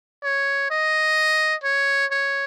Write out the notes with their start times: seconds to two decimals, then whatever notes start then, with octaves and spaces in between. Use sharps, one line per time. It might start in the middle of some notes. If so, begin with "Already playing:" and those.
0.24 C#5
0.71 D#5
1.64 C#5
2.11 C#5